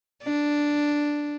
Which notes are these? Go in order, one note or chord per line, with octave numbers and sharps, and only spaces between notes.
D4